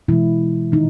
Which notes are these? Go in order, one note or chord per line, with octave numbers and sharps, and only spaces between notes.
B2 E3 G#3 E4
A#2 D#3 D#4